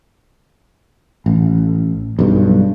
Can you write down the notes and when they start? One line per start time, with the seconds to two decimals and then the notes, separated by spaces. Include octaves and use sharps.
1.26 A1
2.19 B1 G2